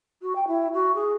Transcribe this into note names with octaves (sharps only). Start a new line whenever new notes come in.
F#4
G5
E4
F#4
G#4